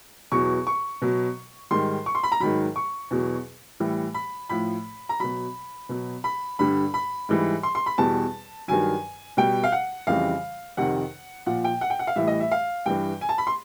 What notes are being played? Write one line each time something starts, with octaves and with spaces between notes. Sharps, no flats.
E2 B2 F#3 C#6
C#6
B2 F#3
G#2 D#3 G3 C6
C#6
C6
B5
A#5
G#2 D#3 F#3 B5
C#6
E2 B2 F#3
A2 E3 G3
B5
A2 F3 B5
A#5
B2 F#3 B5
B2 F#3
B5
G2 D3 G3 B5
B5
G#2 E3 G3
C6
C6
B5
E2 B2 G3 A5
G2 D#3 F#3 G#5
B2 G3 G5
F5
F#5
F2 C#3 E3 G3 F5
F2 C3 D#3 F#5
A#2 F3 F#5
G5
F#5
G5
F#5
F5
A2 E3 G3 E5
D#5
E5
F5
G2 E3 G3 G5
G#5
A5
B5
C6